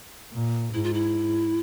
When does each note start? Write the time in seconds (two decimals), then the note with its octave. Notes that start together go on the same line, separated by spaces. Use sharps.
0.32 A#2
0.73 G#2 E4
0.83 F4
0.93 E4